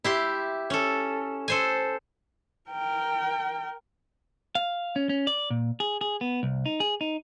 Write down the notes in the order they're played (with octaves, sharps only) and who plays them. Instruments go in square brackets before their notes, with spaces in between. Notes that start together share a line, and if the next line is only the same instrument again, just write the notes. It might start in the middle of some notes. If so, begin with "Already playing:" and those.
[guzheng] E4 G4 C6
C#4 A4
A4 C5 G#5
[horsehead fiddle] A#4 G5
[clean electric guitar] F5
C#4
C#4
D5
A#2
G#4
G#4
B3
C2
D#4
G#4
D#4